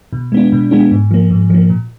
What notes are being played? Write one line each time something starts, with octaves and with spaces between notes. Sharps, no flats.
B2
G#3 B3 D4
B2
G#3 B3 D4
G#2
F3 A#3
G#2
F3 A#3
A#2